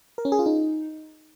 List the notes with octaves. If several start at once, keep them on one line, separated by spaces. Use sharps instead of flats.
A#4
C#4
G#4
F4
D#4